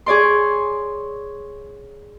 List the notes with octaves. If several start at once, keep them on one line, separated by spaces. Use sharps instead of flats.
G#4 C#5 D5 C6